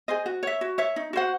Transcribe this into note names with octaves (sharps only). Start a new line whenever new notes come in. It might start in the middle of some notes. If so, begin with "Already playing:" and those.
G#4 C5 D#5
F#4
C#5 E5
F#4
C#5 E5
D#4
F#4 C5 F#5